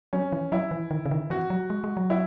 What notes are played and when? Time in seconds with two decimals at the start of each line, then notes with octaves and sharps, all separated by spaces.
0.13 F#3 C#4
0.32 E3
0.52 F#3 E4
0.71 E3
0.91 D#3
1.05 C#3
1.11 D#3
1.30 E3 F#4
1.50 F#3
1.70 G#3
1.84 G#3
1.97 F#3
2.10 E4